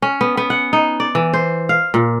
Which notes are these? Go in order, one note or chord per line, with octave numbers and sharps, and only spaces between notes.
C#4
B3
B3
F#5
D#4
D5
E3
C5
F5
A#2